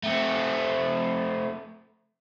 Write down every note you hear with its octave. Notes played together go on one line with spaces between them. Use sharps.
A3 C4